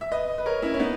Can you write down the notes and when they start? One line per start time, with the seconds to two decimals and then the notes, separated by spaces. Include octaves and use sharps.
0.01 E5
0.12 B4 D#5
0.38 B4
0.46 A#4 C#5
0.62 C#4 E4
0.74 C#4
0.79 B3 D#4